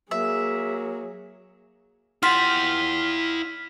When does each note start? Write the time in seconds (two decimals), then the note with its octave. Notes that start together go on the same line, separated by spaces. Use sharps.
0.11 F#3 A#3 G#4 E5
2.23 E4 F4 G4 F#5 F6 B6